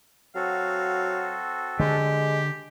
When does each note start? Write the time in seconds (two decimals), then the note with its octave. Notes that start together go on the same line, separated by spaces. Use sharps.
0.35 F#3 C4 F#4 A4 F5
1.80 D3 G#3 G4